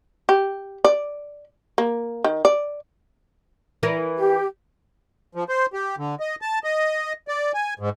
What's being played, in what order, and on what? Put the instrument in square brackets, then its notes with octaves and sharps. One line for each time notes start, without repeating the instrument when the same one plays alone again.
[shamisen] G4
D5
A#3
D#3
D5
[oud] E3 E4 A#4
[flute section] G4
[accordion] F3
C5
G4
D3
D#5
A5
D#5
D5
G#5
G#2